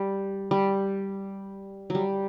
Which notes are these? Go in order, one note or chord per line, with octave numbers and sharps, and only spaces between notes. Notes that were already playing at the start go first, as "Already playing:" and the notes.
Already playing: G3
G3
F#3 G3